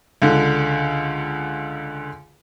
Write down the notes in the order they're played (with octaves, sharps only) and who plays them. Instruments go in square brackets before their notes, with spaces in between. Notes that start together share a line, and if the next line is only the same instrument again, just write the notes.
[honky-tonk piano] C#2 D3